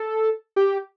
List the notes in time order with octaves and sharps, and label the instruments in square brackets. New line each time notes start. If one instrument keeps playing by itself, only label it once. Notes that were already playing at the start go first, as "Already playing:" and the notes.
Already playing: [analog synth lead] A4
G4